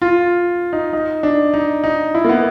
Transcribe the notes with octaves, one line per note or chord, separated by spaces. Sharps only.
F4
D#4
D#4
D4
D#4
D#4
E4
A#3
B3